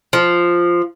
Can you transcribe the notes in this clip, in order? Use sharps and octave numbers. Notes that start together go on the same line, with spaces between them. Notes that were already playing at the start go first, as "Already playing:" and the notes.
F3